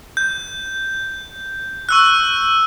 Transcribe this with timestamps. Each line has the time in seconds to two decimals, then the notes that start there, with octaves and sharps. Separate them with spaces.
0.17 G6
1.89 C#6 E6 F#6